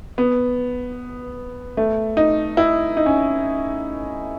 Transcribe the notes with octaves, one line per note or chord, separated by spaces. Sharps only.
B3
A3
D#4
E4
D#4
C#4